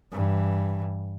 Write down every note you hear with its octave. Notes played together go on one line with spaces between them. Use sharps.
G2 E3